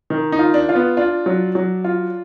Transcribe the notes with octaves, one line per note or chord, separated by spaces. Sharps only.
D#3
D#4
F4
D4
F4
B3
D4 F4
F#3
F#3
F4